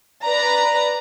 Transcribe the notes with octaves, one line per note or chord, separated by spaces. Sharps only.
B4 D5 A#5